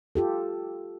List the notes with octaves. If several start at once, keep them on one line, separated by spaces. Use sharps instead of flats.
F4 G4 A4